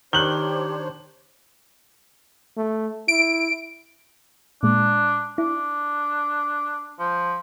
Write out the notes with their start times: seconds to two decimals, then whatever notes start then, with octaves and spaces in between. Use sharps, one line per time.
0.13 D#3 D4 G4 C5 C#5 F#6 F#7 G7
2.57 A3
3.08 E4 D7
4.63 A#2 G#3 D4
5.38 D4 E4
6.99 F3